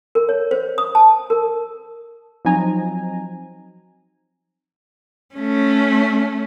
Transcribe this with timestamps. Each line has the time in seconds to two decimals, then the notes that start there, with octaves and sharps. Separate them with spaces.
0.15 A#4
0.29 C#5
0.51 C5
0.78 D#6
0.95 A5
1.30 A#4
2.45 F3 F#3 C4 D#4 G#5 A#5
5.35 A3 C#4